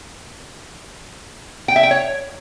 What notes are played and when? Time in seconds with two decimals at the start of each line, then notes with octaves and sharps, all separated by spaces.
1.68 G5
1.76 E5
1.83 G5
1.91 C#5